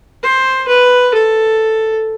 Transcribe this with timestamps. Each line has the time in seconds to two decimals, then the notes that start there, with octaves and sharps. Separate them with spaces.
0.23 C5
0.68 B4
1.13 A4